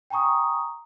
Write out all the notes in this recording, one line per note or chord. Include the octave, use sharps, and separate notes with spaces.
G5 G#5 A#5 C#6 D#6